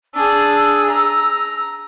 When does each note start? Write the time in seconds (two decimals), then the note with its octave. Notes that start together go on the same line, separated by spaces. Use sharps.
0.15 D4 G#4 E6
0.90 A#5